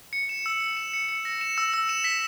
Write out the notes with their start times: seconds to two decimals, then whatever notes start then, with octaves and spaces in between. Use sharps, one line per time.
0.13 C#7
0.29 E7
0.46 E6
0.61 E6
0.77 E7
0.93 C#7
1.09 C#7
1.25 A#6
1.41 E7
1.58 E6
1.74 E6
1.89 E7
2.04 B6